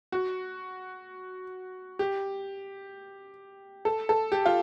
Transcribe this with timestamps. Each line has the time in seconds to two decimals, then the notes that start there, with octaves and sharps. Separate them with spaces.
0.12 F#4
1.99 G4
3.85 A4
4.09 A4
4.32 G4
4.46 F4